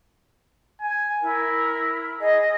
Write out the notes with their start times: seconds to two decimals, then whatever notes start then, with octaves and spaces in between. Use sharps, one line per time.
0.81 G#5
1.22 E4 A#4
2.20 G#4 D#5